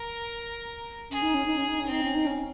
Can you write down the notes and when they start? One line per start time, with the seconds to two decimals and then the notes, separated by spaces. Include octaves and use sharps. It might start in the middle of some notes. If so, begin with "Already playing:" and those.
Already playing: A#4
1.11 C#4 G#4
1.22 D#4
1.34 C#4
1.46 D#4
1.57 C#4
1.69 D#4
1.80 C#4
1.87 C4 D#4
2.03 C#4
2.15 D#4
2.26 C#4